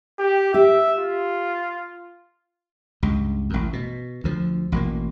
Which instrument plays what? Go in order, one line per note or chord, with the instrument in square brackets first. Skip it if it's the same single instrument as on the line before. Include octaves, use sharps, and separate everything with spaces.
[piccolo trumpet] G4
[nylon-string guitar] G4 [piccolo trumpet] E5
[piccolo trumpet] F4
[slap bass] C#2 G2
A1 F#2
B2
D2 F3
A1 B2 F3 A#3